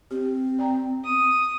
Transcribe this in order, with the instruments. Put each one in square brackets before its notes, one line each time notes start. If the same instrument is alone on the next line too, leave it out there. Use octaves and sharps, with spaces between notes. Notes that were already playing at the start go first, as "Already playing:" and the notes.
[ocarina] C4 [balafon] G4
[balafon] D5 G5 A#5
[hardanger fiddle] D#6